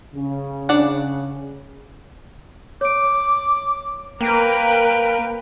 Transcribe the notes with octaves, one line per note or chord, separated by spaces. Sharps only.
C#3
D4 D5 F#5
C#5 D6 D7
A#3 A#4 B4 G5